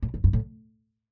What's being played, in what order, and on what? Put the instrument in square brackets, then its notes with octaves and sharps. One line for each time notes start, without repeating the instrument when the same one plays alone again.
[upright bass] A2
G2
G2
A2